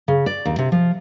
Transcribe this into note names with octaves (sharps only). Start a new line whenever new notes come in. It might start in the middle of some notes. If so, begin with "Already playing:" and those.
C#3
D5
D#2
C3
F3